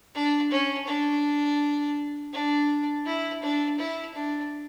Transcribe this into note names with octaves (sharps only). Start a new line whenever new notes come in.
D4
C#4
D4
D4
E4
D4
E4
D4